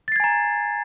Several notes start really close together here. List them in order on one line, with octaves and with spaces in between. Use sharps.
A6 C7 G#6 G#5 A#5